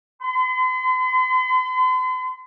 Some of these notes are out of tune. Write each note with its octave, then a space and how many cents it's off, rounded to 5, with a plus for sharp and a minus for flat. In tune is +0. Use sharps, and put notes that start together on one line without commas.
C6 -45